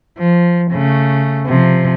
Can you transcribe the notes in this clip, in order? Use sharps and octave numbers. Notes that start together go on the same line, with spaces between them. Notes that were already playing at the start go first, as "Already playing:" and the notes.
F3
C#3 A3
C3 F3